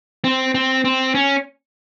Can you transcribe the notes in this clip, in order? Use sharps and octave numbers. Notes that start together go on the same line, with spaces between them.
C4
C4
C4
C#4